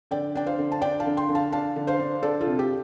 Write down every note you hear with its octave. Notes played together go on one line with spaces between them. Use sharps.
D3 D5 G5
D4 G5
C5 F5
D3
A5
D4 D5 G5
F5 A5
D3
G5 C6
D3
F5 A5
D4 F5 A5
D3
C5 F5
D4
D4 A4 D5
F4 A4
C3
G4